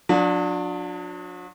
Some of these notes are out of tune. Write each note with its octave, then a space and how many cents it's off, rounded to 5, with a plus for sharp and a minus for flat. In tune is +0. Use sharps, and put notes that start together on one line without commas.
F#3 -45 D4 +0